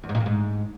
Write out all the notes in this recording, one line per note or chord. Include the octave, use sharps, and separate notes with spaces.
E2
G#2
A#2
F2
G#2